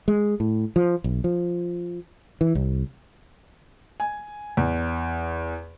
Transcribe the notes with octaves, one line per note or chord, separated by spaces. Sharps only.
G#3
A2
F3
B1
F3
E3
C2
G#5
E2